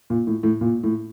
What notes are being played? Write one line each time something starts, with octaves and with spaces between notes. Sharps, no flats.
A#2
A2
A2
A#2
A2